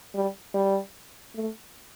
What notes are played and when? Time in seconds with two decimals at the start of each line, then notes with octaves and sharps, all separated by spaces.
0.15 G3
0.54 G3
1.35 A3